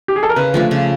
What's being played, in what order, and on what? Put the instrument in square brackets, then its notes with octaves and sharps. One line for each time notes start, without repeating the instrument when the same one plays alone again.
[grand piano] G4
G#4
A4
A#4
[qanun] C#3 [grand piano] B4
[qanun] F3 A3 D4
C#3